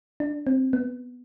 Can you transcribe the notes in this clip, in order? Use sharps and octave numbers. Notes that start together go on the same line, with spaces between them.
D4
C4
B3